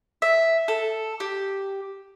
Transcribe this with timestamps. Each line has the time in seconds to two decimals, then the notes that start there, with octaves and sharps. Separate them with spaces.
0.22 E5
0.68 A4
1.20 G4